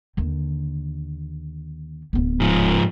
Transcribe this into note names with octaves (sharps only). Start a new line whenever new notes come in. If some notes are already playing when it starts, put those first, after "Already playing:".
D#2 D3
D1 B3
G#2 F3